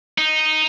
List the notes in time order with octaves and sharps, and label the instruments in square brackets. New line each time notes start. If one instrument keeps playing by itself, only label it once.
[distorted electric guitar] D#4